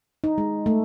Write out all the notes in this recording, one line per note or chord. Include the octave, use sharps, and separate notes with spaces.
D#4
G#3
A3